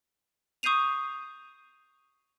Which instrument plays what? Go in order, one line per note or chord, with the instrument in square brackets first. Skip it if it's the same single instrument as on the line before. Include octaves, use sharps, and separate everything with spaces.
[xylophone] C#6 D#6 G6 C7 D#7 F7